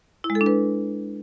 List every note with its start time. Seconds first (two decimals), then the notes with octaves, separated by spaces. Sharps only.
0.24 E4
0.30 G#3
0.35 A4
0.41 D4
0.46 B4